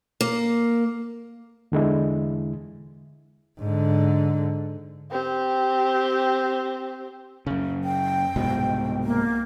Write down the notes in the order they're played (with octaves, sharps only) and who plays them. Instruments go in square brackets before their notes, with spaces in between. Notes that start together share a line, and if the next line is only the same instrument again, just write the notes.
[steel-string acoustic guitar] A#3
[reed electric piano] E2 D3 G#3 E4
[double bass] G#2 D3
[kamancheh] C4 G4
[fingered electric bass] F#2 C#3
[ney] G5
[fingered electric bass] C2 G#2 B2
[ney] A#3